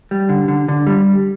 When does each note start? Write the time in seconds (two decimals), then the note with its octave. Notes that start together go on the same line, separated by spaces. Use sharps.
0.11 G3
0.29 D3
0.48 D3
0.68 D3
0.87 G3